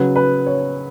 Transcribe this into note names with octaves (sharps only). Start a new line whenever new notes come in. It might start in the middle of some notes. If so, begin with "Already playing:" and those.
Already playing: C#3 F#3 B4
B4
C#5